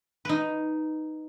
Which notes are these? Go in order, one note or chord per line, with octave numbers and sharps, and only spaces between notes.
D#4 B4